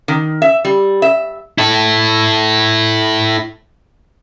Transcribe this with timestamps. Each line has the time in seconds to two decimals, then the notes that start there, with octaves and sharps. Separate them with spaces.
0.08 D#3
0.42 E5
0.65 G3
1.02 E5
1.58 E4 A4